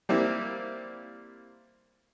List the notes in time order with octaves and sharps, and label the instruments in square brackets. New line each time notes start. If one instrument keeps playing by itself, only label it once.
[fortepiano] G3 A#3 C4 E4